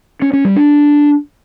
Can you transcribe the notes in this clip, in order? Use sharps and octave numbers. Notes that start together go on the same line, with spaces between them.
C#4
C#4
G3
D4